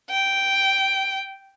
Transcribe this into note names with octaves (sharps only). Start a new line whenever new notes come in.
G5